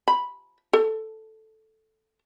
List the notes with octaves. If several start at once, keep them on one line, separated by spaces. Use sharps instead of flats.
B5
A4